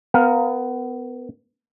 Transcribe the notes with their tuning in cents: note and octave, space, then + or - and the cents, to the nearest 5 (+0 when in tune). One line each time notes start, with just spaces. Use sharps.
B3 +25 A#4 +0 F5 +15